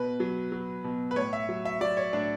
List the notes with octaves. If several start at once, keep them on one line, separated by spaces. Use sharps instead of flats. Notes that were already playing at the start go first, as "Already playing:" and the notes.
Already playing: B2 B4
F#3
F#3
B2
B4
A2 C#5
E5
F#3
E5
F#3 D5
C#5
A2 D4